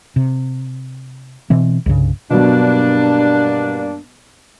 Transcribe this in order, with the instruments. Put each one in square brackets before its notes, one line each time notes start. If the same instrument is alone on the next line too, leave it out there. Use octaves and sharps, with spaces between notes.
[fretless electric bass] C3
B2 E3 C4
C2 G2 C#3
[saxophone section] G2 A#3 D4 [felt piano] B2 F#3